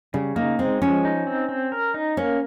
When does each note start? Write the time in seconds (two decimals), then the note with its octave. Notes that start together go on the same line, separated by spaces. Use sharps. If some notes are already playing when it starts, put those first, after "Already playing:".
0.14 C#3 G3
0.36 A#3 D#4
0.59 G#3 C4
0.82 F3 C#4
1.05 D#4
1.27 C4
1.49 C4
1.72 A#4
1.94 D#4
2.17 A#3 C#4